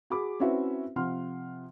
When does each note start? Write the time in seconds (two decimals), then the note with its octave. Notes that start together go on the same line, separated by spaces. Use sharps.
0.10 F#4 G#4 B5 D6
0.40 C4 C#4 E4 F#4 B4 E5
0.96 C3 F3 F#5 C6 F6